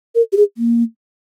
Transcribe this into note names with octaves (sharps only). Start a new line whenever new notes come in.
A#4
G4
G#4
A#3